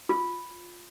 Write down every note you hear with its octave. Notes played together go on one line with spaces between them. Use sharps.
F4